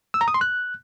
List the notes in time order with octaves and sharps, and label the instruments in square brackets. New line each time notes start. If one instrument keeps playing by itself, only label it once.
[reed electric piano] E6
A#5
D#6
C6
F#6